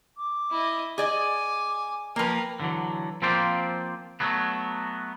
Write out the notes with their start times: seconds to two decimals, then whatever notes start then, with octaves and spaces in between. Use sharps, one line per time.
0.17 D6
0.51 E4 D#5
0.98 G#4 D5 D#5 G#5 D6
2.16 F3 A#3 A#4 B4 G5
2.60 D3 E3 F#3
3.22 F3 A#3 C4 F4 C5 D5
4.20 F#3 A3 B3